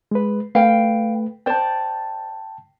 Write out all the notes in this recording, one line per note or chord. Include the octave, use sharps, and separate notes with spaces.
G#3 B4
A3 B4 F5 G5
C5 D5 G5 A5